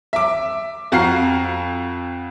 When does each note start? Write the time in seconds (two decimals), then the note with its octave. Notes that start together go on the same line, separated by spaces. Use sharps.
0.13 E5 D6
0.92 F2 F#4 F5 A#5 C7